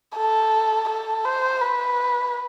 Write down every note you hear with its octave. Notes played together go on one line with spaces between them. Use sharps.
A4
A4
C5
B4